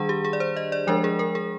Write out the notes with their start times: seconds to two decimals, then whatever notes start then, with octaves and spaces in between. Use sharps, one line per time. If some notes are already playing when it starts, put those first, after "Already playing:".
Already playing: D#3 G3 D4 G#4
0.09 G4
0.25 G#4
0.33 D5
0.40 C5
0.57 D#5
0.72 D5
0.87 F3 G#3 D4 A#4
1.04 G#4
1.19 A#4
1.35 G#4